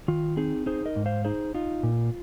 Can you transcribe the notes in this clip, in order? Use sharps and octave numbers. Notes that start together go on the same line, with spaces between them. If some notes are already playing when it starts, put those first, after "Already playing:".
D#3 F4
C4 D#4 G#4
D#4 G#4 C5
A#4 D#5
G#2
C5 F5
D#4 G#4 C5
D#4 F4
A#2